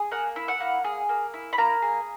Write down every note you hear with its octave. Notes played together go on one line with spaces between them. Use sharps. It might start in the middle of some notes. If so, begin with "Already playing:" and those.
Already playing: G#4
A#3 F#5
E4
F#5
A#3
G#4
A#3
E4
B5
A#3 A#5
G#4